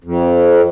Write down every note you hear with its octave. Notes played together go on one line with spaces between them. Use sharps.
F2